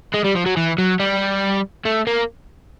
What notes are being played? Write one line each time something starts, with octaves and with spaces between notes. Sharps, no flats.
G#3
G3
F3
F#3
E3
F#3
G3
A3
A#3